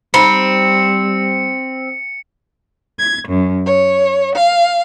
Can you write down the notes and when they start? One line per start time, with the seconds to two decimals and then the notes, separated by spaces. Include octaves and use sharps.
0.14 G3 C4 D#4 A#5 B5 C#7
2.99 G#6
3.29 F#2
3.66 C#5
4.34 F5